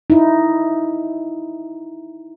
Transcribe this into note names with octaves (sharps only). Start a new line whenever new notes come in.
D#4 E4